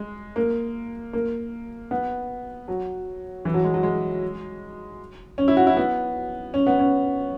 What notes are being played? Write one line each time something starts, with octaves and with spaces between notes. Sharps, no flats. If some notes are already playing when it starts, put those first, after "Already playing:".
Already playing: G#3
A#3
A#3
B3
F#3
E3
F#3
G#3
F#3
G#3
C#4
E4
F#4
E4
B3
C#4
B3
C#4